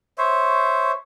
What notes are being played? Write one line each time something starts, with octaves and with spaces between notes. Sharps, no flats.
C5 C#5 E5